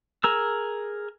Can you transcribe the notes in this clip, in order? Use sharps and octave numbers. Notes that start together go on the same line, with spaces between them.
G#4 A#4 E6